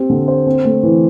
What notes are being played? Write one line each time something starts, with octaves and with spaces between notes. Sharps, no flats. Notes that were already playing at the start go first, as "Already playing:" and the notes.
Already playing: C4 G4
D3
C5
C4
A3
E3